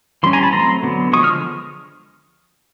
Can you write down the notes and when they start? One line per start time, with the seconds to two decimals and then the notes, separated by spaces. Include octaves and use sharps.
0.23 E3 G3 C#4 C6
0.33 G#5 A#5
0.43 A5 B5
0.53 F#3 A3 C4 A#5 C6
0.83 D3 F#3 B3
1.13 D3 F3 G#3 C#6 D#6
1.23 D#6 F6